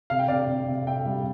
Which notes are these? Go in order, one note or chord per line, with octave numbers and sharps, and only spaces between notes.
C3 F5
G5
C3 D5 F5
C3
C3
C3 E5 G5
G3